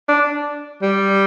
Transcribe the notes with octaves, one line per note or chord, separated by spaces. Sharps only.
D4
G3